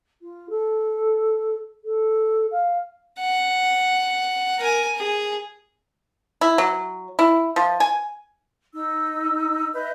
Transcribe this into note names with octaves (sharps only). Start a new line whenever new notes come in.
F4
A4
A4
F5
F#5
A#4 G#5
G#4
E4
F#3
E4
F3
G#5
D#4 E6
B4 D#5 E5 G6